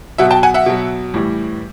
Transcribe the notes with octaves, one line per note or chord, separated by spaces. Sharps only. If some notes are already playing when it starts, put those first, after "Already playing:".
B2 F#3 E5 F#5
G5 A5
F#5 G#5
E5 F#5
B2 F#3
A2 E3 G3